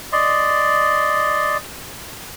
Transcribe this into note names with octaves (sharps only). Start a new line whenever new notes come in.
D5 D#5 C6